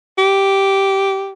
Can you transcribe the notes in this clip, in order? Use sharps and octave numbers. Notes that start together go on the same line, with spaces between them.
G4